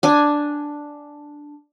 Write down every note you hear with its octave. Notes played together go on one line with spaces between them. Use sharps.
D4 G#5